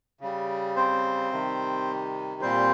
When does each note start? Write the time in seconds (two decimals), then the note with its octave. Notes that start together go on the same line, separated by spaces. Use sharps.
0.21 C#3 G3
0.76 C4 C5
1.31 C3 D#3 G3
2.41 A#2 G3 C4 C5